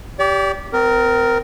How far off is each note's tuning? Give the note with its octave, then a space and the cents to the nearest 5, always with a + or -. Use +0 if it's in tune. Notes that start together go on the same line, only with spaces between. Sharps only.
G4 +0 D5 -35
C4 -35 A#4 +0